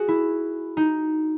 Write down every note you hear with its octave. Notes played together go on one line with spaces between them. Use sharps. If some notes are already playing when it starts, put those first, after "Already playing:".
Already playing: F#4 G#4
E4
D#4